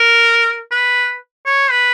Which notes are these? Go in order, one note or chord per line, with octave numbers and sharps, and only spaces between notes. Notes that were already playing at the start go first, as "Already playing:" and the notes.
Already playing: A#4
B4
C#5
B4